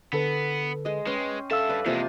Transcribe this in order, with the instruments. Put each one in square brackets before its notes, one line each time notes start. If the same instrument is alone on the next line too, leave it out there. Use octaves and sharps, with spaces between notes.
[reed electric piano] D3 A4 B4 [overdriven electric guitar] B3
[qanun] G#3 D#5
[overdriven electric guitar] G#3 [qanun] C#4 G5 C6 [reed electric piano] B4
[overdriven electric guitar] G2 A5 [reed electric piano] A4 F5 E6 [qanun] E5
[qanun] B4 D5
[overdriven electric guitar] E2 G#3 [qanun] C3 F3 A#3